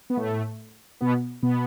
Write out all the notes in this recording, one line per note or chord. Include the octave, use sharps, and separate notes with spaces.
B3
A2 A3
B2 B3
B2 B3